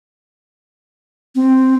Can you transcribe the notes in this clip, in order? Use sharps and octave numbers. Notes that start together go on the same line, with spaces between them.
C4